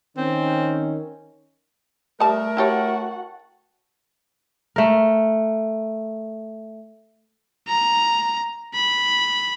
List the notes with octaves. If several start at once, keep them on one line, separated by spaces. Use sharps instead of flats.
D#3 C4 C#4
G3 A3 A#4 E5 A5 D#6
E4 F#4 G4 C#5 F#5 G5 A5 A6
A3 A#4
A#5
B5